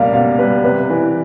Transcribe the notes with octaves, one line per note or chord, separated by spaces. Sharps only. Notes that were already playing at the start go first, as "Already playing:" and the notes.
Already playing: C#2 B2 G3 A#3 F5
B2 F5
G3 B4
C3 B4
E3